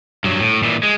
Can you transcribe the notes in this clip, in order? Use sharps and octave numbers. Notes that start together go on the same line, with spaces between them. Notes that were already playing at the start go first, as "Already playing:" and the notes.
G2 F#3
A2
A#2 E3
G#3